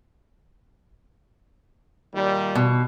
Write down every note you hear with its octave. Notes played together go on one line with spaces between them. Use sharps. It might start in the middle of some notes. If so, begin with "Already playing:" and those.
A#2 D#3 G3
B2